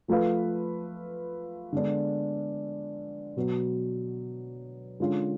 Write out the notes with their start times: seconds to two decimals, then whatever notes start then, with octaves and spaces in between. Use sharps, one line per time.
0.08 F3 A3 F4 B4 F5
1.73 D3 G#3 B3 D4
3.37 B2 F#3 B3
5.00 D3 G#3 C#4 F4